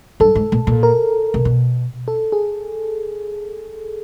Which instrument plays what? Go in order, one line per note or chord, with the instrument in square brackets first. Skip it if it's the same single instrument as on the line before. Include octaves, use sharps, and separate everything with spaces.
[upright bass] G2 [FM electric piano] A4
[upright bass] G#2
A#2
A#2
[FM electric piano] A#4
[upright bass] C3
B2
[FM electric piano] A4
G#4